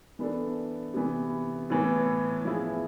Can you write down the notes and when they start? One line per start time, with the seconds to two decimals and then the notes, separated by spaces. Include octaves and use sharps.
0.19 E3 B3 D4 A4
0.94 C3 E3 B3
1.70 A2 E3 B3
2.45 F3 B3 E4 G#4